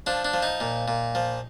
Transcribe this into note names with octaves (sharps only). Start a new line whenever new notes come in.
F3 D4
D4
F3
D#4
A#2
A#2
F3